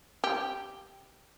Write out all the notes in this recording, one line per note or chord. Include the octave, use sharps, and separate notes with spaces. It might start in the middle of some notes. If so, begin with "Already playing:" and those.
G4